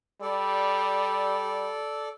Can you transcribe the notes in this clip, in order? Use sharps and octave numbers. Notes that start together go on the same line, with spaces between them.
G3 A4 D5